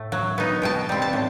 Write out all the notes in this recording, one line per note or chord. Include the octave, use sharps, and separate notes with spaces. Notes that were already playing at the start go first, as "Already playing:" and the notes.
Already playing: A2 A3
F#3
B3 D#4
B2 G5 A5
G3 C4
A5
A2